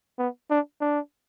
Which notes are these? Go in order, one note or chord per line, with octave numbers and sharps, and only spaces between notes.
B3
D4
D4